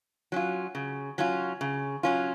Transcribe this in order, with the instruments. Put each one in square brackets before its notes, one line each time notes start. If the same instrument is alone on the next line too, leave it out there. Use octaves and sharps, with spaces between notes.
[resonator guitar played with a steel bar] F#3 C#4 F4
C#3
F#3 C#4 F4
C#3
F#3 C#4 F4